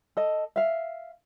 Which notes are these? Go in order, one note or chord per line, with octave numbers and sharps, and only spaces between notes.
A4 D#5
E5 F5